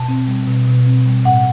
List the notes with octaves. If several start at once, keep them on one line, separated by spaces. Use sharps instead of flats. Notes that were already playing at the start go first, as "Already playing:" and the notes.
Already playing: B2 A5
C4
G3
B2
B2
C4
G3
A2 F#5